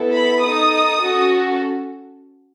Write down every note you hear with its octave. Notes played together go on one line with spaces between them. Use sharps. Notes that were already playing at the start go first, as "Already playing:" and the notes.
Already playing: B3 E4 A4
B5
D#4 A4 D#6
C#4 F#4 A4